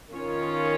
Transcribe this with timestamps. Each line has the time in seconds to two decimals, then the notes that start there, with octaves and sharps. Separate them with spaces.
0.14 D#3 C#4 F4 C#5